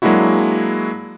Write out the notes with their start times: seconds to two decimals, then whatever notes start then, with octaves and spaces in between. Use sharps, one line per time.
0.02 F#3 G#3 A#3 D4 E4 F#4